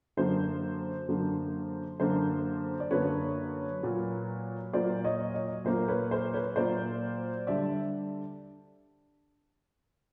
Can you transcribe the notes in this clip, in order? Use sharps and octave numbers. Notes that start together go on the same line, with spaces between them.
F#2 D3 F#3 A#3 C5
F#2 D3 F#3 A#3
F#2 D3 F#3 A#3 C5
D5
F#2 D3 F#3 A#3 B4 C#5
A#2 F#3 A#3
A#2 F#3 A#3 C5 D5
C#5 D#5
C#5 D#5
A#2 F#3 A#3 C5
B4 C#5
C5
B4 C#5
A#2 F#3 A#3 C5 D5
D3 G3 D5 E5